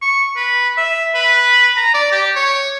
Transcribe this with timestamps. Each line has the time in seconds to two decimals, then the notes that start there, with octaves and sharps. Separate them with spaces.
0.02 C#6
0.36 B4
0.77 E5
1.14 B4
1.77 A#5
1.94 D5
2.12 G4
2.36 C#5